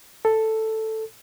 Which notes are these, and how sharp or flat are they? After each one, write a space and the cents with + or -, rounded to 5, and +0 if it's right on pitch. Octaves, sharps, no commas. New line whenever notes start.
A4 +5